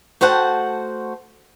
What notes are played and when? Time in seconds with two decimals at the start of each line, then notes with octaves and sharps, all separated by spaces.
0.21 A3 F#4 C5 F#5 A5